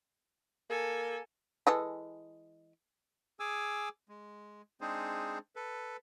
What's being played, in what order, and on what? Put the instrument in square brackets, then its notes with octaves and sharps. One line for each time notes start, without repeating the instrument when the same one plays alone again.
[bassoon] A#3 [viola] A4 G#5
[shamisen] E3 G#3 A4
[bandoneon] G#4 G#5 D6 E6
G#3
G#3 C4 D4 D#4 G#4 C5
A4 B4